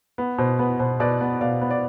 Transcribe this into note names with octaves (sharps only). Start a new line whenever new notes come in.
B3
B2 C5
B3 B4
B2 C5
B2 B4 D5
B3
B2 D5 F5
B3
D5